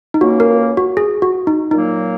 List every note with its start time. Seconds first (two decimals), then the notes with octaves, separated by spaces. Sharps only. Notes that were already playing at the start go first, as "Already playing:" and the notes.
0.14 D#4
0.20 C#2 C#3 A#3 F#4
0.40 A#4
0.77 F#4
0.97 G#4
1.22 F#4
1.47 D#4
1.71 A#2 F#3 A#3 D#4